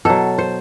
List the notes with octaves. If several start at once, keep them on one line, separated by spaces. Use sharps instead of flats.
B2 F#3 A4
C5